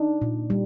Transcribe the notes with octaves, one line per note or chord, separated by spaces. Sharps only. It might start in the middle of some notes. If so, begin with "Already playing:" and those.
Already playing: D4 D#4
A#2
G3